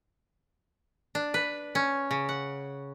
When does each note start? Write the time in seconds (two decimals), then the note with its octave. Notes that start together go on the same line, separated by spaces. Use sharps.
1.15 D4
1.34 B4
1.75 C#4
2.11 C#3
2.29 F#5